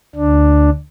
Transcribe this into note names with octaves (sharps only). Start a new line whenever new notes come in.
D2 D4